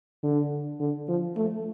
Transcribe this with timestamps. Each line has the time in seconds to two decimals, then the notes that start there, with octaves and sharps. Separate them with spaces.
0.23 D3
0.80 D3
1.08 F3
1.37 A3